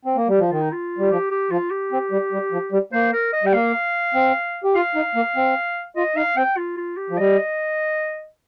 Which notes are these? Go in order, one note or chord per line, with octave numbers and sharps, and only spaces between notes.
C4
A#3
G3
F3
D#3 F4
D#4
F4
G3
F3 G4
G4
F3 F4
G4
C4
G3
G3
F3
G3
A#3 C5
A#4
D#5
G3 G5
A#3 F5
C4
G4
F4 F5
D#4
A#3
C4
F4 D#5
D#4 F5
C4 G5
F4
F4
G4
F3
G3 D#5